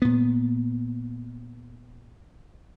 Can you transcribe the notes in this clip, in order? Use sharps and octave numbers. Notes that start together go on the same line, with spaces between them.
A#2 B3